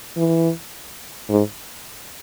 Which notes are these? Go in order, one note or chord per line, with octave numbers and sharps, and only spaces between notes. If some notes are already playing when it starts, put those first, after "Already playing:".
E3
G#2